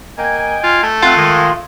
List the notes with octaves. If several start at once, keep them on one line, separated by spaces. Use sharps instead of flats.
A#3 D#5 G5 G#5
F4
A3
C4 F4 F#5
D#3 G#3